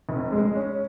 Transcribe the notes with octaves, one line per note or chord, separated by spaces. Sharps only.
F1
G#3
C#4